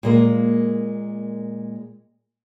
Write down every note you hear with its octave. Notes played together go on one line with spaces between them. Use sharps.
A#2 G#3 A#3